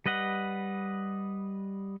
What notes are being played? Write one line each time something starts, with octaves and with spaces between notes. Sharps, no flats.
G3 B4 D#5 F#5